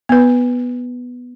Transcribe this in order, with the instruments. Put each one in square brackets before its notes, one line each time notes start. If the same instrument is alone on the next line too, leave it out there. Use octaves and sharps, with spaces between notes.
[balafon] B3 B4